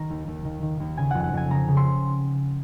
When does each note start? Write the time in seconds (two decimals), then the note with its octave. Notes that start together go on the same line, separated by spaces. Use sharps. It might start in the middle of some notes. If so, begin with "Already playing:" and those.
Already playing: D#3 A#5
0.10 D#2
0.28 D#2
0.45 D#3
0.62 D#3
0.80 D#2
0.97 C#3 G#5
1.11 F2 F#5
1.24 F#5
1.33 F2 G#5
1.50 C#3 A#5
1.68 C#3
1.77 C6